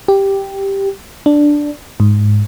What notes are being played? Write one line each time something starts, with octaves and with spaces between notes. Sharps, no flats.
G4
D4
G#2